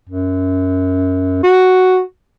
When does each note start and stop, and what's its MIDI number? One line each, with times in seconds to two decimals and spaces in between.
0.09 1.41 42
1.43 2.01 66